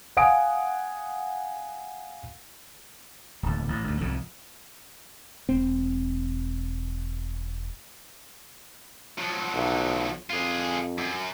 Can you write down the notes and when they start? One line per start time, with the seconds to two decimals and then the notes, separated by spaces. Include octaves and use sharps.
0.17 F5 F#5 G#5 D#6 D7
3.43 D1 D#2
3.68 A1
3.87 D2 G#2
4.01 C2 F2 G#2 C#3
5.49 E1 C4
9.18 F3 F#3
9.55 B1
10.30 F2 F4 G#4
10.98 F#2